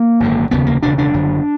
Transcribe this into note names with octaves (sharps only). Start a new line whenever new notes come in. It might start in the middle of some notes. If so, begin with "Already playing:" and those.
Already playing: A#3
G#1 F#2 D3
F1 D#2 C#3 B3
A#3
E1 D2 C#3 D4
D4
F#1 F#2 D3